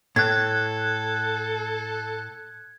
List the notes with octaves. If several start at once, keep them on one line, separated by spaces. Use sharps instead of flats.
A2 A4 F#6 G#6